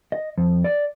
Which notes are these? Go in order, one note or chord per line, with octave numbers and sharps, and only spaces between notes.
D#5
F2
D5